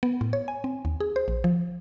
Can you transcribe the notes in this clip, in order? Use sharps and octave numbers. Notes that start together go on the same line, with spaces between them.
B3
A2
C#5
G#5
C4
D#2
G#4
C5
A#1
F3